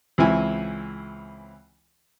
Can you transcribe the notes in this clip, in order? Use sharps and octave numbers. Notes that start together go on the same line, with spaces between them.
C#2 E3 C4 E4 G#5